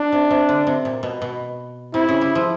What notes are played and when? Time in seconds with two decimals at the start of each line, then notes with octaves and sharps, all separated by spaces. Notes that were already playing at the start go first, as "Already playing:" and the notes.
Already playing: D4
0.12 C3
0.31 C3
0.49 D3
0.67 C3
0.85 A#2
1.03 B2
1.22 B2
1.94 C3 E4
2.09 C#3
2.21 G3
2.35 F3